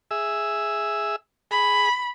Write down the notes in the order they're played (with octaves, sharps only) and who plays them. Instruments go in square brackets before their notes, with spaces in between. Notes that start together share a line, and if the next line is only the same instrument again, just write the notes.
[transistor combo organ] G#4 E5 E6
[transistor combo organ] G#4 [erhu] B5